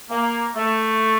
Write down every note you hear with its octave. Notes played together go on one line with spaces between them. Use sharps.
A#3
A3